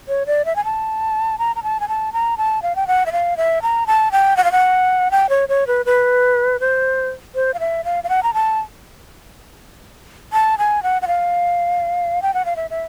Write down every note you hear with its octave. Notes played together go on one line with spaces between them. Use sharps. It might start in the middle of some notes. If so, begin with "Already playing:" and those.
C#5
D5
E5
G#5
A5
A#5
A#5
A5
G#5
A5
A#5
A5
F5
G5
F#5
E5
F5
E5
A#5
A5
G5
F#5
F5
F#5
G5
C#5
C#5
B4
B4
C5
C5
F5
E5
F5
F5
F#5
A#5
A5
A5
G#5
F#5
F#5
F5
G5
F#5
F5
E5
E5